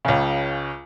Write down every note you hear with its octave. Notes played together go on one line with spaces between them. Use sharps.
C#2 C#3